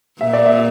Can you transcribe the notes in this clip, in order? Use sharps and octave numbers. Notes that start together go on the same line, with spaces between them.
A#2 E5
D5
E5